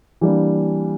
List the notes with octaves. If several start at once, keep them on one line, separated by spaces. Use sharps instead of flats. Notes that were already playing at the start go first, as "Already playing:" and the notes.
E3 G3 A#3 D4